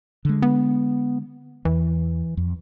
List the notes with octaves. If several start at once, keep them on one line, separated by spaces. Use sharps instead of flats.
D3 G#3
B3
E2 E3
F2